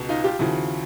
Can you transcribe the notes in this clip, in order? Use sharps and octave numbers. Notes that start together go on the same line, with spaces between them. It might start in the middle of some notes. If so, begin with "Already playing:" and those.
Already playing: C#2 B2
D#4 F4
F4 G4
D#2 C#3 F3 E4 F#4